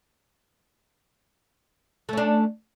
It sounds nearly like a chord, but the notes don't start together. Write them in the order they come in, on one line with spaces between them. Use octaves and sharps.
A3 C#4 D4